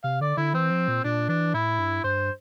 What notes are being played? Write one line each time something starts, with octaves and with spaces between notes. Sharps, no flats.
C3 F5
D3 D5
D3 E4
E3 C4
F3
A#2
A#2 D4
E3 D4
A2 E4
G2
G2 C5